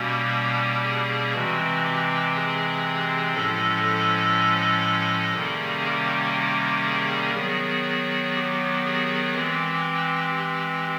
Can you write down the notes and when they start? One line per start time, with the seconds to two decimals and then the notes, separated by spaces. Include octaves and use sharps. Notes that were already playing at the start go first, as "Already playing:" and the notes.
Already playing: B2 G3 A#3 C#4 G4
0.83 G#4
1.33 C3 E3 G#3 C4 F#4
1.83 G4
2.34 G#4
3.33 A2 F3 G#3 C#4 A4
3.83 A4
5.33 C3 D#3 G3 A#3 C#4 G#4
5.85 G4
6.34 G4
6.85 G#4
7.34 D#3 F#3 B3 G#4
8.35 G4
8.85 G#4
9.34 E3 G#3 C4 G4
10.35 G4